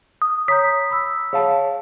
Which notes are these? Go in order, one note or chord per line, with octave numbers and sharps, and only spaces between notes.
D#6
C#5 A#5 D#6 G6 B6
B5 E6
G#4 C#5 F5 A5